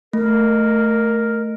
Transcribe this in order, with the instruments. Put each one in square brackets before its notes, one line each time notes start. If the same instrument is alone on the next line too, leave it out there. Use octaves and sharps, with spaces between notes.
[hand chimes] A3 [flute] A#4